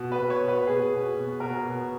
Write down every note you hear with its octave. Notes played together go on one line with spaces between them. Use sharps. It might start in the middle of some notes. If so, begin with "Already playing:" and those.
Already playing: B2
B4
B2
C#5
B2
B4
B2 G#4
B2
B2
B2 A#4
B2